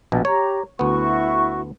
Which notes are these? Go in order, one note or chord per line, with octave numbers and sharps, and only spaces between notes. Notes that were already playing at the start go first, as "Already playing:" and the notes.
A#1 B2 A5
G4 C#5 A#5
D2 B3 E4 F#4 C#6